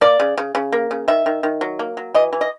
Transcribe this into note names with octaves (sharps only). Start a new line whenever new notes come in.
A#3 D5
C#3
C#3
C#3
A#3
C#3
D#3 E5
D#3
D#3
F#3
A#3
F#3
E3 D#5
E3
D#5